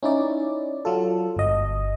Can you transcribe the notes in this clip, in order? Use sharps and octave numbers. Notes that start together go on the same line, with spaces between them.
C#4 D#4 E4 D5
F#3 F4 A4
G1 D#5